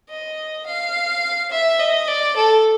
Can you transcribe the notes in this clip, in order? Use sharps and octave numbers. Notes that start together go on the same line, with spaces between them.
D#5
F5
E5
D#5
D5
A4